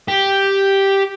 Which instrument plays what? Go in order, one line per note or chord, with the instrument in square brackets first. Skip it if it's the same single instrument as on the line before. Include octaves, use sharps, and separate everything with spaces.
[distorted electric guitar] G4